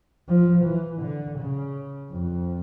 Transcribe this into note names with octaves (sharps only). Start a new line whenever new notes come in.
F3
E3
D3
C#3
F2